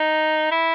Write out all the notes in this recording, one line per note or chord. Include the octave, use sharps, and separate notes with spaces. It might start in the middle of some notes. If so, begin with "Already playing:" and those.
Already playing: D#4
E4